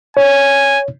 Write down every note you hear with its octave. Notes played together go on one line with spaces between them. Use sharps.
C#5 G#5